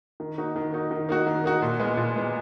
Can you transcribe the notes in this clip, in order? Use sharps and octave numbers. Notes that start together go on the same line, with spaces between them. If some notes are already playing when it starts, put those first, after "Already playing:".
D#3
A#3 D#4 F#4
D#3
A#3 D#4 F#4
D#3
A#3 D#4 F#4
D#3
A#3 D#4 F#4
A#2
G#3 B3
A#2
G#3 B3